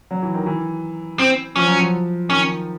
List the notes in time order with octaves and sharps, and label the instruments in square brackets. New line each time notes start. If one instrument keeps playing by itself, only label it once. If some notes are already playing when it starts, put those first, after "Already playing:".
[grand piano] F#3
E3
D#3
E3
[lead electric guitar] C4
[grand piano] F3 [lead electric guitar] C#4
[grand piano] F#3
F3
[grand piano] D#3 [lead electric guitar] C#4